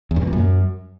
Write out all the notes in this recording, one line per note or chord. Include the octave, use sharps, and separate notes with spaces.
E2
G2
B2
A#2
F#2